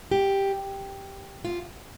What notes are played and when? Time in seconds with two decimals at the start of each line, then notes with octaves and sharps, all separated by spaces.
0.11 G4
1.45 F4